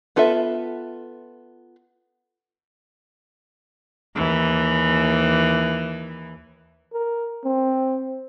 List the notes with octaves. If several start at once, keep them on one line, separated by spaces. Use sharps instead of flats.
B3 F4 A4 B4 E5
D#2 E3
A#4
C4